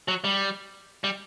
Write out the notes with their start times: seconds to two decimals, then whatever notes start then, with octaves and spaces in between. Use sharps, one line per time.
0.08 F#3
0.24 G3
1.04 G3